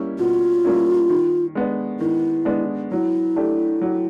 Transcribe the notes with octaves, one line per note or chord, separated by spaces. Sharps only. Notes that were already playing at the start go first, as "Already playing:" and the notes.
Already playing: G3 A#3 C#4 E4
B2 F4
G3 A#3 C#4 E4
D#3
G#3 B3 D4
D#3 E4
G#3 B3 D4
F#3 E4
A3 D4 G4
F#3